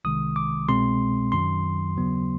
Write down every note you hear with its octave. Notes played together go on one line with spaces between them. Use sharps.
C2 C3 D#3 G#3 D#6
D6
C2 B2 G#3 C4 C6
F#2 D#3 F#3 C6
D#2 C#3 F#3 B3